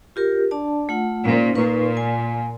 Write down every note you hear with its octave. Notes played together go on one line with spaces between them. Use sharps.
F4 G4 A#4
D4 D5 A5
A3 F4 F#5
A#2 C#4 D#4 C5
A#2 D#4 B4 C#6
G#5